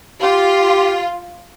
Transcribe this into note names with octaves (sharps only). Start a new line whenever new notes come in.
F4 G4